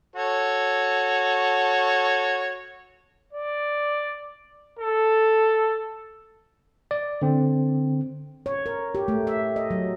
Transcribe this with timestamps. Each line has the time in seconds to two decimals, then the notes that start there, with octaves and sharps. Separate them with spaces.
0.16 F#4 A4 C#5
3.33 D5
4.79 A4
6.91 D5
7.22 D3 C4
8.46 C#5
8.66 A#4
8.95 G4
9.08 A3
9.27 E5
9.56 D#5
9.71 F#3